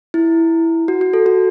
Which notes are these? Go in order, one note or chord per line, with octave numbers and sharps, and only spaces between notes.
E4
F#4
F#4
A4
F#4